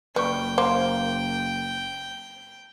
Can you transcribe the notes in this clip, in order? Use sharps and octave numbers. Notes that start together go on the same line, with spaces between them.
F#1 G3 B4 G5 C#6
A#3 C5 C6 D6